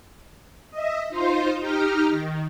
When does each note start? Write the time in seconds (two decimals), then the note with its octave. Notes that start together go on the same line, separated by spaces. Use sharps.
0.71 D#5 E5
1.09 D#4 F4 C5 C6
1.59 D#4 G4 A#5 F6
2.09 D#3